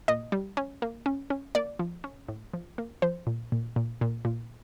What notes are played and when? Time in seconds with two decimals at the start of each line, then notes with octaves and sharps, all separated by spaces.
0.08 A#2 D#5
0.32 G3
0.57 C#4
0.82 A#3
1.06 C#4
1.30 C#4
1.55 A#3 D5
1.79 F3
2.04 C#4
2.28 A2
2.54 F3
2.78 A#3
3.02 F3 C5
3.27 A#2
3.52 A#2
3.76 A#2
4.01 A#2
4.25 A#2